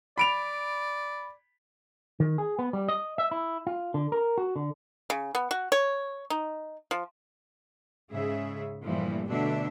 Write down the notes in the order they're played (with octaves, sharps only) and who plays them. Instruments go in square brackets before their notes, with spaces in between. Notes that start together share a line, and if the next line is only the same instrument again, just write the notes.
[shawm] D5 [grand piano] B5 D7 F7
[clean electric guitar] D#3
G#4
B3
G3
D#5
E5
E4
F4
D3
A#4
F#4
D3
[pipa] C#3
B3
F#4
C#5
D#4
F3
[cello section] G#2 C#3 G#4 E5
G2 A#2 E3 F3 G3 A3
B2 D3 F#3 A3 D4 E5